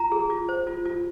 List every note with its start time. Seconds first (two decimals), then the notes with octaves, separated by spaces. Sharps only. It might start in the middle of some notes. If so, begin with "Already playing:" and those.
Already playing: F4 A#5
0.12 G#4
0.30 F4
0.49 C5
0.67 F4
0.86 F4